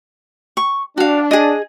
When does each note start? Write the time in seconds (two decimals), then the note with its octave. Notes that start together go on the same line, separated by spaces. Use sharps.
0.57 C#6
0.98 D4 F#4 F5
1.31 G#4 D#5